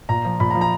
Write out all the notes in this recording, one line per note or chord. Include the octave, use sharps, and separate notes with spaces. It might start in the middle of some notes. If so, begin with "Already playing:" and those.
A#2 A#5
F3
A#2 B5
A#5
F3
A#5